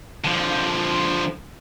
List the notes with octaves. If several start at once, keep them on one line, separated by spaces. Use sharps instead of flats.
D3 F3